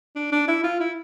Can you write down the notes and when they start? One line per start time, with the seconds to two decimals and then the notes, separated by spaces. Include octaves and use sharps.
0.16 D4
0.32 D4
0.48 E4
0.64 F4
0.80 E4